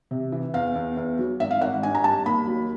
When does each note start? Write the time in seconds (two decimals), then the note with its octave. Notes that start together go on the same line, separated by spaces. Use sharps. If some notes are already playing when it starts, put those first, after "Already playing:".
0.11 C3
0.32 E3
0.54 E2 F5
0.75 E2
0.97 E2
1.19 F#3
1.40 G#1 E5
1.51 F5
1.61 G#1 F#5
1.83 G2 G#5
1.95 A#5
2.04 G3 A5
2.26 D#2 B5
2.47 F#3